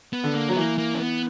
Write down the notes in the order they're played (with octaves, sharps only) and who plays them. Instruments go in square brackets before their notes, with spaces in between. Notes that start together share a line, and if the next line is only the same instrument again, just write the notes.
[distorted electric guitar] B3
[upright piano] D3
[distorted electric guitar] A#3
[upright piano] F#3
[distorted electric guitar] B3
[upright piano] E3 [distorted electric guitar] A#3
[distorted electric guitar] A#3
C#4
B3